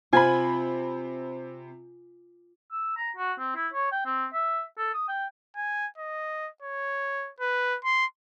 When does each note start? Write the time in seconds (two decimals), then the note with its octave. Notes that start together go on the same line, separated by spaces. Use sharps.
0.13 C3 C4 F4 G#5 B5
2.71 E6
2.97 A#5
3.17 F#4
3.39 C4
3.55 E4
3.73 C#5
3.92 G5
4.06 C4
4.33 E5
4.78 A4
4.94 D#6
5.08 G5
5.56 G#5
5.98 D#5
6.62 C#5
7.40 B4
7.84 C6